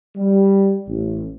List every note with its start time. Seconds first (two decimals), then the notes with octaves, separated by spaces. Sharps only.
0.17 G3
0.88 A1